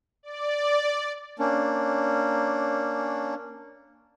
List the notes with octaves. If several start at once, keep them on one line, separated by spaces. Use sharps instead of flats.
D5
A#3 C#4 D4